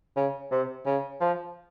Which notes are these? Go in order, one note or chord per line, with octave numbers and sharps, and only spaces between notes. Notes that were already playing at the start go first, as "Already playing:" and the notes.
C#3
C3
C#3
F3